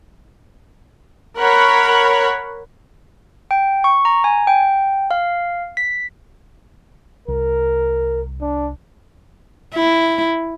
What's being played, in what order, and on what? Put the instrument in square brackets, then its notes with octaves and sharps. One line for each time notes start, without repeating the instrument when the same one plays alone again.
[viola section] A#4 C#5 F#5 B5
[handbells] G5
C#6
A#5
G#5
G5
F5
B6
[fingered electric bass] C2 [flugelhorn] A#4
[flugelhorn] D4
[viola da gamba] E4